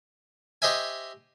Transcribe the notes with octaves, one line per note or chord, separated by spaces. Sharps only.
G4 C5 D#5 E5 G#5